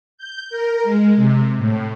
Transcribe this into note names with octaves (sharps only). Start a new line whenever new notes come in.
G6
A#4
G#3
C3
A2